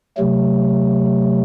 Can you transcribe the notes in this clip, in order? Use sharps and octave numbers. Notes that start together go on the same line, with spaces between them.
C3 F#3 A3